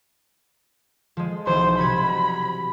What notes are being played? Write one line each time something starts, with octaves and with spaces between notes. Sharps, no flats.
F3 G#3
B1 E3 C5
C3 F#4 B5 G#6